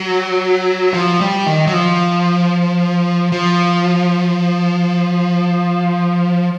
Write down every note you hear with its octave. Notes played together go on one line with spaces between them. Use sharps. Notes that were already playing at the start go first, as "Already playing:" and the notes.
Already playing: F#3
F3
G3
D#3
F#3
F3
F3